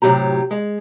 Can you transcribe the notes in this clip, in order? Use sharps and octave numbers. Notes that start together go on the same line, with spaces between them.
A2 C3 F3 F#3 G4 A#5
G#3